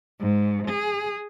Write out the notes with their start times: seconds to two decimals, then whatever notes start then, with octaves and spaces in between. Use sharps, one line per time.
0.19 G#2
0.67 G#4